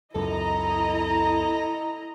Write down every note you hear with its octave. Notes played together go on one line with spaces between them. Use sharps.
C#2 F#2 E4 A4 D#5 A#5